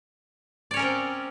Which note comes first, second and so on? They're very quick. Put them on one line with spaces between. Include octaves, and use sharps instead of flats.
D5 C#5 C#4 A#4 C4